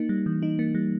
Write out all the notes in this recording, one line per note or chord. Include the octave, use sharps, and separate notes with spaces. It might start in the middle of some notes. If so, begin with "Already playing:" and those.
Already playing: A#3 D#4
G3
E3
D#4
A#3
G3